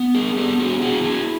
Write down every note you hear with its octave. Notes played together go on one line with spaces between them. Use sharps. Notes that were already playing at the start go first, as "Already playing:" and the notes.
Already playing: B3
G#4 A#4
B3 G4 A4
F#4 G#4
E4 F#4 G#4
F#4 G#4